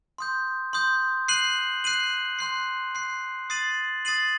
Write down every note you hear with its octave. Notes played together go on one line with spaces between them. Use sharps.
C6 D#6 G6
C6 D#6 G6
F#6 C7 D#7 F#7
F#6 C7 D#7 F#7
C6 F#6 C7
C6 F#6 C7
D#6 A6 C7 D#7 F#7
D#6 A6 C7 D#7 F#7